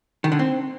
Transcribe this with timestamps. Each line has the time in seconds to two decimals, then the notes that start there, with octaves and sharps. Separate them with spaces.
0.24 D#3
0.32 D3
0.39 C4